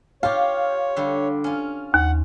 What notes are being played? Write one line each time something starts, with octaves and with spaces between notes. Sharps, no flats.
F4 G4 C#5 F5
D3 G3
C#4 F4
D#2 F#5